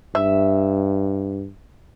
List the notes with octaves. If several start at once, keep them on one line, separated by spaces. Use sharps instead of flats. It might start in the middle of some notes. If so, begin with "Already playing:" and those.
G2 E5